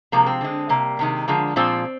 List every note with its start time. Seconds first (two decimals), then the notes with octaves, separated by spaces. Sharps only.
0.12 C3 F3 G#3 A#3
0.26 C4
0.41 D3 G#3
0.69 C3 G3 A#3
0.99 C3 D#3 G#3
1.28 D3 F3 G#3
1.56 A#2 F3 G#3 C4